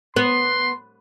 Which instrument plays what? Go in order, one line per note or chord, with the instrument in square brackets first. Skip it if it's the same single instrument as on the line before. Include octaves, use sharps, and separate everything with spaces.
[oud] B3 [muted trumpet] C6